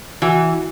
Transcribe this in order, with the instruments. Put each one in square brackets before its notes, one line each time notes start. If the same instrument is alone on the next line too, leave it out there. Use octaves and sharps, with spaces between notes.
[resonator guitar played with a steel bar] E3 [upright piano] F#4